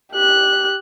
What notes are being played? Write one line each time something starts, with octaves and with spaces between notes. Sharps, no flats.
G4 F#6